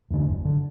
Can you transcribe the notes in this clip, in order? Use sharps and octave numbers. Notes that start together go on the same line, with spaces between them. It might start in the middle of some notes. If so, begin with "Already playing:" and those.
E2 D3
F#1
D3